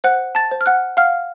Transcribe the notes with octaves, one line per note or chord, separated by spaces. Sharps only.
C5 F#5 F#6
A5 A6
C5
F6
F#5 F#6
F5 F#5 F6